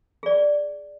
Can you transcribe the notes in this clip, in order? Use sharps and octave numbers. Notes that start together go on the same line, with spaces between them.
G#4 D5